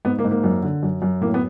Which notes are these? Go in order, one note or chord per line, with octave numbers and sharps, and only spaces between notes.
G#2 B3
A#3
G#2
A#3
F#2
D3
F#2
F#2
A2 A#3
B3